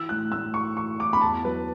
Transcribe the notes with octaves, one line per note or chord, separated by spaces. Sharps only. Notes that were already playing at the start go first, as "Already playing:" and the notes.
Already playing: E3 E6
A2 F#6
A2 E6
E3 C#6
E3 C#6
E3 D6
B5
E2 A5
F#3 B4